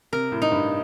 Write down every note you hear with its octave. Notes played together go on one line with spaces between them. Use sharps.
C3 A#4
A2
D#4
G2